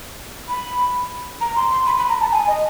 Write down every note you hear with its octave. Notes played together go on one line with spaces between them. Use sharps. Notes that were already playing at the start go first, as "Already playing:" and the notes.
B5
A#5
C6
C6
B5
B5
A#5
A5
G#5
D#5